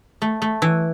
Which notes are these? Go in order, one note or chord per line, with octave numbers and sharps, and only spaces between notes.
A3
A3
E3